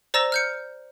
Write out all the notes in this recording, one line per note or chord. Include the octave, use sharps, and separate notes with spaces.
C5 D5 A#5 E6 A#6 E7
F6 G6 C#7